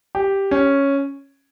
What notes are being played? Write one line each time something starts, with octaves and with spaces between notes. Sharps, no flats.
G4
C#4